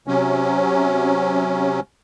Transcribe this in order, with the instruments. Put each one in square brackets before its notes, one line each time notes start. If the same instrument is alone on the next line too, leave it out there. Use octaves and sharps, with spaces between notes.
[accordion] C3 F#3 C#4